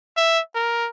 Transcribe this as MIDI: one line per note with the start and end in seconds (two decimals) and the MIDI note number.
0.17 0.40 76
0.55 0.89 70